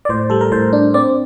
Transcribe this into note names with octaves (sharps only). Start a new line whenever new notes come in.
D5
A2 C5
G3 A4
A#4
A2 C5
D4
C4 D5